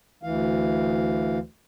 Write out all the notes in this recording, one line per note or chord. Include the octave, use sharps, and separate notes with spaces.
D2 E3 F5